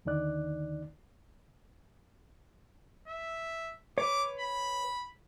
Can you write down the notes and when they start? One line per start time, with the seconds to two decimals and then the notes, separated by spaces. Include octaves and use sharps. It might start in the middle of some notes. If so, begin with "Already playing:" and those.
0.05 D#2 D3 D#3 D#4 D5 F#6
3.08 E5
3.98 B4 C#5 D6
4.40 B5